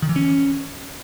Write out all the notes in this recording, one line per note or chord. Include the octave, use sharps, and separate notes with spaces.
D#3
E3
C#4